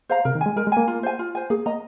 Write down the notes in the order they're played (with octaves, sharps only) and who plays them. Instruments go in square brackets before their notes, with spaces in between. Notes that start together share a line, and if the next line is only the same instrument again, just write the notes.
[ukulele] C5 F5 A#5
[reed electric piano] C3 [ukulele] A#4
[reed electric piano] D#3
[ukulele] G#5
[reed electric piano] G#3
[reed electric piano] G#3 [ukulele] A#4
[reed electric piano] G#3
[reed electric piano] A#3 [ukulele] G#5
[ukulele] F4
C5 G#5
F4
C5 G#5
[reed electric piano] A#3 [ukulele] G#4
[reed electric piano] A#3 [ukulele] D#5 A#5